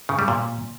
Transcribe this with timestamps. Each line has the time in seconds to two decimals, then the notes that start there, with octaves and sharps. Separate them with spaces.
0.09 C#3
0.19 G3
0.28 A#2